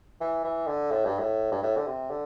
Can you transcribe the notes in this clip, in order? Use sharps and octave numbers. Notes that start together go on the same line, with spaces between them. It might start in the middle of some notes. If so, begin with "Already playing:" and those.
E3
E3
D3
A2
G2
A2
G2
A2
D3
C3
D3